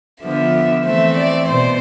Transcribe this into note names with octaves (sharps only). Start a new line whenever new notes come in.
D3 F3 B3 E5
E3 A3 C4 E5
D5
B2 C5